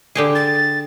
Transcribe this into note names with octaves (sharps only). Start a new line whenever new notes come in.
D3 G4 G#4
A6